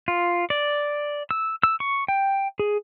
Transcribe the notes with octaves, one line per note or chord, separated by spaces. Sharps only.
F4
D5
E6
E6
C#6
G5
G#4